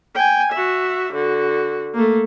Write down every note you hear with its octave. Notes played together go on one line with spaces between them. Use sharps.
G5 G#5
F#4 E5
D3 F#4
A3 A#3